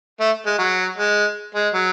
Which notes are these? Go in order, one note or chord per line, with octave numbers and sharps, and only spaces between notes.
A3
G#3
F#3
G#3
G#3
F#3